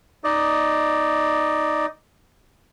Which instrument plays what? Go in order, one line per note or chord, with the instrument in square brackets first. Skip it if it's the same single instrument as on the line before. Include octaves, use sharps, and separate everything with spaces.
[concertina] D#4 D5 D#5